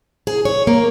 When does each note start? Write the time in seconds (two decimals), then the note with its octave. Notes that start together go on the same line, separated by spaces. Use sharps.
0.27 G#4
0.45 C#5
0.67 A#3